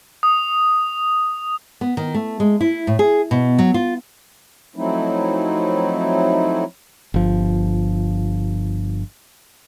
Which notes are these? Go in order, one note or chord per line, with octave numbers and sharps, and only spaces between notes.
D#6
B3
D#3
A3
G#3
E4
A2
G#4
B2
F#3
F4
F3 F#3 A3 C4 D#4 E4
G1 F3